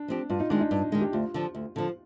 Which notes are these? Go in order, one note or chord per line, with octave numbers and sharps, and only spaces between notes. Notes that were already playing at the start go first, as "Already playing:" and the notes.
Already playing: D4
F3 C4 G4
G2 F4
D#4
D#3 G#3 D4
D#4
G2
D#3 G#3
G4
D2 F4
D3 F3
D2
D3 F3